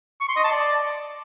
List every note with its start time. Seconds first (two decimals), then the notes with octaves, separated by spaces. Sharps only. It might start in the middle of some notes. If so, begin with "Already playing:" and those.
0.21 C#6
0.29 C6
0.36 D#5
0.44 A5
0.52 D5